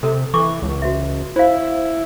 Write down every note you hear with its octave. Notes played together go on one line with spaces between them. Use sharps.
C3 A4 A#4
E3 A4 C#6 D6
C#2
F#4 B4 E5
E4 C5 F5